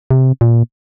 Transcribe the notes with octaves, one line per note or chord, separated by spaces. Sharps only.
C3
A#2